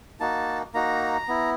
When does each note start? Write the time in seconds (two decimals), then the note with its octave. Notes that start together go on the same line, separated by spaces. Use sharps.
0.20 A#3 D#4 F#4 A5
0.74 A#3 D#4 F#4 A#5
1.28 B3 E4